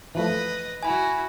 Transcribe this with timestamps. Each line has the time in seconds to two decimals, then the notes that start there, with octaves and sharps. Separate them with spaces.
0.15 E3 F3 A3 B4 D#5
0.83 E4 F#4 G#5 B5